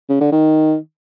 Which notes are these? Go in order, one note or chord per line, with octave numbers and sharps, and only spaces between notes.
C#3
D3
D#3